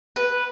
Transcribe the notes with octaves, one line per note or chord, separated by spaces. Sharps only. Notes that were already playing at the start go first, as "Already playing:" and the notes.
B4